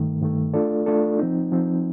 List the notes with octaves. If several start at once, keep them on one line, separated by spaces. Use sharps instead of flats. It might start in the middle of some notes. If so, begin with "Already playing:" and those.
Already playing: G2 D#3 A3
G2 D#3 A3
A3 D4 F4 A4 D5
A3 D4 F4 A4 D5
F3 C4 D#4
F3 C4 D#4